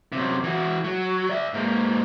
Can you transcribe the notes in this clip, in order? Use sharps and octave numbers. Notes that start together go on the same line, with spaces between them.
F#2 C3
E3 F#4
F#3
D5 E5
G#2 A#3